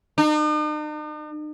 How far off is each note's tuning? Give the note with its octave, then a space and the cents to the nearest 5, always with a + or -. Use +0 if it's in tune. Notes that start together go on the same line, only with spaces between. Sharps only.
D#4 -45